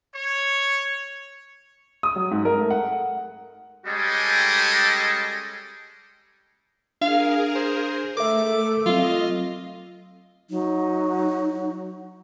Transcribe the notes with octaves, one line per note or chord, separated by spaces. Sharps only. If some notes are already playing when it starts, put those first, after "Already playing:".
C#5
D#6
F#3
G#2
A#4
A3
F#5
G3 G#3 C#4 G4 A4 D#5
D4 G#4 A#4 F5
C5
A3 A4 A#4 E5 D6
F#3 C4 F4 D#5
F#3 D#4